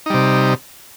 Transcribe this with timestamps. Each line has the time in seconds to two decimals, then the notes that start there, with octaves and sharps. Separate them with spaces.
0.06 D#4
0.10 G3
0.14 C3